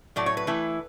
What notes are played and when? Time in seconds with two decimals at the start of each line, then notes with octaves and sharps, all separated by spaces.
0.16 A2 F#3 A3 D5
0.26 C#5
0.37 B4
0.47 E3 A3 E4